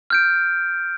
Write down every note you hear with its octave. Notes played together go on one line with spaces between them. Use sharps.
F6 G6 D7